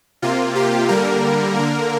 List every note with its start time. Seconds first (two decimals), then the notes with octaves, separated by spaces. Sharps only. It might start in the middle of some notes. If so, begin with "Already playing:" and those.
0.22 C3 A#3 F4
0.55 G4
0.88 D3 G3 A#3 A#4
1.56 D3 A#3